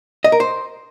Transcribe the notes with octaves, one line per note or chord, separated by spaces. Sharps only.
D#5
A#4
C5